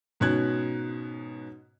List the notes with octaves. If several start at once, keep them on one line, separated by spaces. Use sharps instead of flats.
G#2 B2 C#4 F#6 G#6